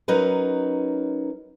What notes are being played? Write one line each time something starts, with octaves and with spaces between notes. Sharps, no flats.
F#3 C#4 D#4 A#4 B4